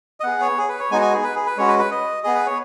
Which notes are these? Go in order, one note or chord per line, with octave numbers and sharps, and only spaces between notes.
D#5
B3 G#4 F#5
C#5
G#4
B4
C#5
G#3 B3 D#4 F#4 G#5
G#5
G#4
B4
G#4
B4
G#3 C#4 F#4 C#5
B4
B4
D#5
B3 G#4 D#5
B4
C#5